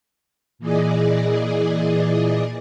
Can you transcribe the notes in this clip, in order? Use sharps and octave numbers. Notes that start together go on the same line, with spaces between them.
A#2 E3 G#4 D5 D#5